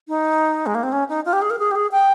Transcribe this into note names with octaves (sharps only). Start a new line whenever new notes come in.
D#4
G#3
A#3
C4
C#4
D#4
F4
G4
G#4
A#4
G#4
G4
G#4
G5